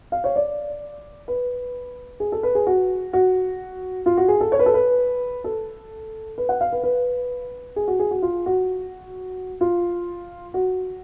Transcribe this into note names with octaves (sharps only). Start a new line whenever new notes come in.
F5
C#5
D5
B4
G#4
A4
B4
G#4
F#4
F#4
F4
F#4
G#4
A4
C#5
B4
A4
B4
A4
B4
F#5
F5
B4
B4
G#4
F#4
G#4
F#4
F4
F#4
F4
F#4